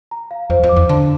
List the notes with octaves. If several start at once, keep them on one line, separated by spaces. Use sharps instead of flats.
A#5
F5
F2 C5
F2
D6
E2
D3 A5